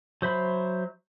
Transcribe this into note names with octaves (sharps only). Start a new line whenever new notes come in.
F#3 C5 E5 B5